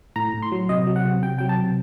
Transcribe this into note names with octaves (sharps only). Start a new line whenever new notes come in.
A2 A#5
A2
C6
F#3
C3 D#5
F#3
F#5
C3
C3 G5
F#3 G5
A5
C3